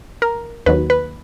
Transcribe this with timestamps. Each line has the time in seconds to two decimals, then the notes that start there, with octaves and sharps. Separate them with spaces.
0.22 A#4
0.66 D#2 D#3 F#3 B4
0.90 B4